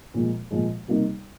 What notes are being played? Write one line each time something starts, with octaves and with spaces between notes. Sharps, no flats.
A#2 F3 G#3
A#2 F3 G#3
C3 G3 A#3 D#4 G4